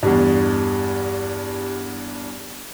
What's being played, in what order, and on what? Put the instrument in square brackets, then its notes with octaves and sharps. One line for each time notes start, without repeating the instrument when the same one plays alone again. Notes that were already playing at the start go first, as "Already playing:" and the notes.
[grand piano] E2 G2 [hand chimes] G4 D#5